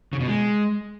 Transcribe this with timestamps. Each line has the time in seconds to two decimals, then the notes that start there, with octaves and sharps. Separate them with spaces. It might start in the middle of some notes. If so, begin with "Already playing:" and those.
0.13 C#3
0.20 B2
0.27 G#3